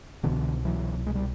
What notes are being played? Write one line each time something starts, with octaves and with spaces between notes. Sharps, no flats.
C2 B2 D3 E3
E3 F#3
G#3
G3